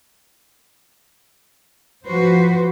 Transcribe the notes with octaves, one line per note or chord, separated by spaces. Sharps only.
F3 F#4 B4 C5